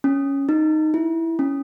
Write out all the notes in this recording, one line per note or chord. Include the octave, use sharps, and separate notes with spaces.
C#4
D#4
E4
C#4